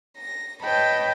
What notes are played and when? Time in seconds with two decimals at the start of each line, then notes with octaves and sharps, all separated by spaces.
0.17 A#6
0.62 B4 C#5 D#5 G5 A5 B5